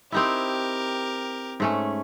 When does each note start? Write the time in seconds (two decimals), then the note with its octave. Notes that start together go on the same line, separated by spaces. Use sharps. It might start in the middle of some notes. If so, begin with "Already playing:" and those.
0.12 C4 D#4 E4 G4 A#4
1.60 G#2 A3 C#4